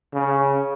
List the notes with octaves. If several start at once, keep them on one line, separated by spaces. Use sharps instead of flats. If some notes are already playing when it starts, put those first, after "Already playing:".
C#3